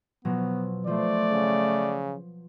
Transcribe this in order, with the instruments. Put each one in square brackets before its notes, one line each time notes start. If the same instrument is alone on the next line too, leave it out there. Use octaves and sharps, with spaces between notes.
[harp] B2 F3 F#3 [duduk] B3
[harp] F3 C5 [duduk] A3 [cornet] D5
[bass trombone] C#3